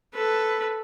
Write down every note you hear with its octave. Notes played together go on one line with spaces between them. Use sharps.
A4 B4